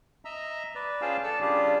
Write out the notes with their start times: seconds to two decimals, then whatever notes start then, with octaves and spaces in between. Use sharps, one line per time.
0.25 D#5 E5 A#5 E6
0.75 B4 D5
1.01 C#4 F4 G#4 F5 G5 A5
1.24 A4 D5 A5 E6
1.41 C#3 G3 D4 F4 G4 G#4